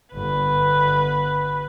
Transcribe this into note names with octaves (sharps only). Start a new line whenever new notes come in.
G1 B4